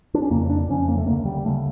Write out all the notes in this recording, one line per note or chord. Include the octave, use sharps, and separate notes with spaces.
D4
C#4
F2 C#3 A#3
D4
F2 C#3 C#4
A#3
A3
D2 C#3 A#3
G3
D2 C#3 A3